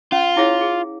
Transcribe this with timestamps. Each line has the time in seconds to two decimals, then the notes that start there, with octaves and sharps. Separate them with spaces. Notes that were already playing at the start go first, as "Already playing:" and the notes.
0.12 C#4 F4
0.36 E4 G#4 C#5 F5
0.61 G#4